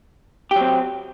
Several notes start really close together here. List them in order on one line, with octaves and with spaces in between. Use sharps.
G4 F#3 C4